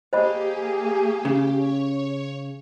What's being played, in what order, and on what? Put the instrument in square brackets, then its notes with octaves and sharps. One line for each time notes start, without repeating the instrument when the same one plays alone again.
[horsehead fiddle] A#3 G#4 [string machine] G4 [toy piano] C5 D#5 B5
[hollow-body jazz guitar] C#3
[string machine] C#5